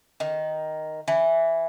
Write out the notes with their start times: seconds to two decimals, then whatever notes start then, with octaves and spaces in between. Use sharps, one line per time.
0.20 D#3
1.08 E3